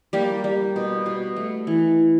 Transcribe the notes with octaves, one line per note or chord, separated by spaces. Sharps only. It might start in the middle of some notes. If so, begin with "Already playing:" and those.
G3 A#3 G4
G3
B2
B2
A3
E3